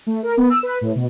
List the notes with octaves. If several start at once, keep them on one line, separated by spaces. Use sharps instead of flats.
A3
A#4
B3
E6
B4
A2
B2